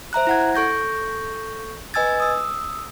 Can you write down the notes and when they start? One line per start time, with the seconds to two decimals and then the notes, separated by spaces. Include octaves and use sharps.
0.13 C5 E5 A#5 F#6
0.27 E4 F#5 G#6
0.54 A4 C#6 G6 A#6
1.94 B4 D#5 G#5 E6 G#6 A6
2.20 D#6 E6